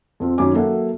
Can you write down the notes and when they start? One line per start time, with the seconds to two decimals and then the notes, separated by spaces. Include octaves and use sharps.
0.20 F2 C4 F4
0.38 F#2 D#3 F#3 C#4 G#5 D6
0.53 F#3 A#3 A4 E5 F#5